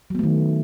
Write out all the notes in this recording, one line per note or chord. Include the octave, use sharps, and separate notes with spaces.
D#3 F#3 A3 B3